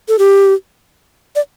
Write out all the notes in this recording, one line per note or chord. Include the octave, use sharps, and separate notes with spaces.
A4
G4
D5